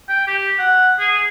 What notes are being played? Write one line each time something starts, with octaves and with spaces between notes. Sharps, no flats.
G5
G4
F#5
G#4